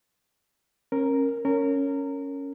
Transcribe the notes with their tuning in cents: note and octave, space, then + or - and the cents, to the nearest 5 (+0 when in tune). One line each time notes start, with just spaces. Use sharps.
C#4 -30 A#4 +0
C#4 +0 A#4 -20